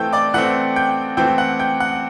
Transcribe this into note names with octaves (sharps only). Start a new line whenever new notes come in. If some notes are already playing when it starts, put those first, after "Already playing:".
Already playing: E3 A3 C4 G5 E6 G6
D5 D6
E3 A3 C4 F#5 F#6
G5 G6
E3 A3 C4 G5 G6
F#5 F#6
G5 G6
F#5 F#6